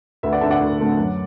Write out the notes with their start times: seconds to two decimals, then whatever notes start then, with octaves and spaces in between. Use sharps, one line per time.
0.23 D2 B4 E5
0.33 D5 F#5
0.41 D3 A3 D4 E5 A5
0.51 D5 F#5
0.61 D2
0.79 D3 A3 D4
0.98 F#2